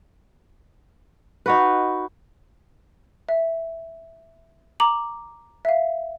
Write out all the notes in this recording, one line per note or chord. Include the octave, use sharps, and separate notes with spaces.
D#4 F#4 B4
E5
A#5 D6 F#7
E5 F5